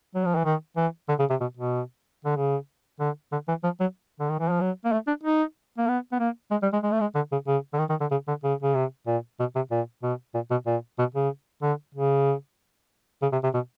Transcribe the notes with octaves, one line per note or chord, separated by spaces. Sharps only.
F#3
F3
E3
D#3
E3
D3
C#3
C3
B2
B2
D3
C#3
D3
D3
E3
F3
F#3
D3
D#3
E3
F3
F#3
A#3
A3
D4
D#4
A#3
B3
B3
A#3
G#3
G3
G#3
G#3
A3
G#3
D3
C#3
C#3
D3
D#3
D#3
D3
C#3
D3
C#3
C#3
C3
A#2
B2
C3
A#2
B2
A#2
B2
A#2
B2
C#3
D3
C#3
C#3
C3
C3
B2